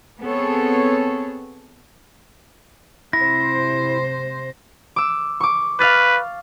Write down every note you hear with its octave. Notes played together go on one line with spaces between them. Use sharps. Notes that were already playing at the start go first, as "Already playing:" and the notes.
B3 C4 G#4 A4 C#5
C3 E4 C5 A#6
D6 E6
C#6 D6
B4 F5 F6 A6